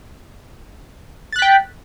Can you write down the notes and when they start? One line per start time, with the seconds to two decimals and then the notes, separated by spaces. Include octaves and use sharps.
1.33 A6
1.36 F#6
1.39 B6
1.42 G5